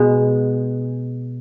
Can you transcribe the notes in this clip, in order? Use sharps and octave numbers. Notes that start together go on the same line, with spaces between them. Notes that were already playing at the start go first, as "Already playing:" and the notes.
Already playing: B2 G#3 B3